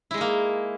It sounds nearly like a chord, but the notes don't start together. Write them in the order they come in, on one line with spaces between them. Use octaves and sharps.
E4 G#3 D#4 A#3